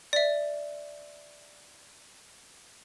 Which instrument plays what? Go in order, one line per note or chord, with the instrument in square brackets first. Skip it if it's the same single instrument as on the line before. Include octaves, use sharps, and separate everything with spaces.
[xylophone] D5 E5